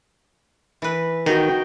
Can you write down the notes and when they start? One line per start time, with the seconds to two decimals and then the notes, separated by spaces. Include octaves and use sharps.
0.82 E3 B4
1.26 D#3 D#4 F#4 G5